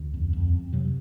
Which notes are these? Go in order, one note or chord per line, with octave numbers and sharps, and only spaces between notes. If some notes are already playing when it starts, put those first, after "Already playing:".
Already playing: D2
F2
F2
F2
C3 F#3